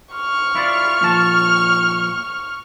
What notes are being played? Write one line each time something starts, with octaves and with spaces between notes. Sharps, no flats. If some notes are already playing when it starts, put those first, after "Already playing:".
C#6 F6
E4 F4 D5
A#2 F3 A5